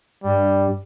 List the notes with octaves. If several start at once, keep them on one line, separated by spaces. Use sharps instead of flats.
G2 G3